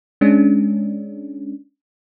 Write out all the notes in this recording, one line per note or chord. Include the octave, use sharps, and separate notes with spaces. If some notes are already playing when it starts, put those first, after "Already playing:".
G#3 C#4 D4